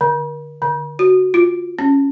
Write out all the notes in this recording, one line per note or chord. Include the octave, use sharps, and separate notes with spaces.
D3
D3
F#4
F4
C#4